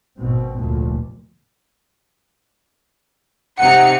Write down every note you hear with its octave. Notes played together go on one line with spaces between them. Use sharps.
G#1 B2 C4
F1 D2 A#2 D3
C3 D#4 F#5 C#7